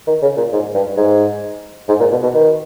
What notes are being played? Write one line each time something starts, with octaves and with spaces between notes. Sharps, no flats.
D#3
C#3
A#2
G#2
G2
G#2
G#2
A#2
B2
B2
D#3